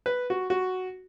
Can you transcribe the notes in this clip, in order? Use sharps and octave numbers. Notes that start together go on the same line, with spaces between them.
B4
F#4
F#4